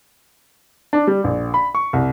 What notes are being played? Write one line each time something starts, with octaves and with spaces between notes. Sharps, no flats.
D4
G3
A#1
B5
C#6
C2